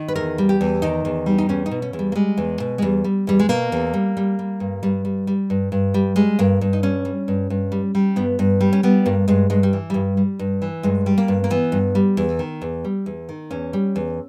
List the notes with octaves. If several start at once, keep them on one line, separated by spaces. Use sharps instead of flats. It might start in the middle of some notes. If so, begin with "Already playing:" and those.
Already playing: D#3
B4
E2 A#4
G3
G4
E2
D#3 D#4
E2
G3
D#4
E2 C#4
D#4
B2
C#4
E2
G3
A#3
G3 G#3
E2
B2
G#3
E2 G3
G3
E2 G3
G#3
B2 A#3
E2
G3
G3
G3
G2
G2 G3
G3
G3
G2
G2
G3
G3 G#3
G2 A#3
G2
D#4
G3 C#4
G3
G2
G2
G3
G3
G2 B3
G2
G3
C#4
G3 B3
G2 A#3
G2 G#3
G2 G#3
G3
E3
G2 G3
G3
G2
E3
G2 G#3
G3
A#3
G2
A#3
E3 B3
G2
G3
E2
D#3
E2
G3
E2
D#3
E2 C#4
G3
E2